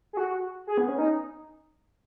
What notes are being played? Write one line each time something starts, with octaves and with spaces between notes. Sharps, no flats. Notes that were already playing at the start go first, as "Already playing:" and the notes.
G#4
F#4
G#4
B3
C#4
D#4